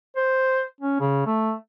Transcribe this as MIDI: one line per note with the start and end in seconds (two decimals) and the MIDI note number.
0.16 0.63 72
0.81 0.98 61
1.00 1.23 49
1.27 1.53 57